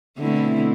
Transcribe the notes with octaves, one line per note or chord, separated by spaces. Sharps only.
B2 D3 A3 C4 E4